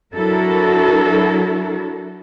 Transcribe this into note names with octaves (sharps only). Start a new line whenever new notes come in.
F#3 D4 E4 F#4 A4 A#4